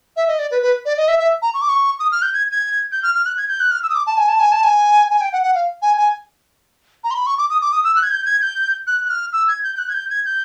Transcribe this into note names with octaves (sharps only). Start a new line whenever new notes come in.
E5
D#5
D5
B4
B4
D5
D#5
E5
E5
A#5
C#6
D6
C#6
D#6
F6
G6
G#6
G#6
G6
F6
F6
F#6
G#6
G6
F#6
F6
E6
D#6
D6
A5
G#5
A5
G#5
A5
G#5
G#5
G5
F#5
F#5
F5
G#5
G#5
A#5
C6
B5
C#6
D6
D#6
D6
D#6
E6
F#6
G#6
G6
G#6
G6
F#6
F#6
F6
E6
G#6
G6
G6
F#6
G#6
G6
G#6
G6